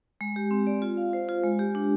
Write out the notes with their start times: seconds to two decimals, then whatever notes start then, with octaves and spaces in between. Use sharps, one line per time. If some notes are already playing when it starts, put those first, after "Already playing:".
0.21 G#3
0.36 G4
0.51 C4
0.67 D5
0.82 F4
0.97 F5
1.13 C5
1.29 F4
1.44 G#3
1.59 G4
1.75 D4